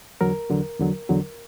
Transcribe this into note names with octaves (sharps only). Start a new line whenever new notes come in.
E2 D3 F#3 A#4
E2 D3 F#3
E2 D3 F#3
E2 D3 F#3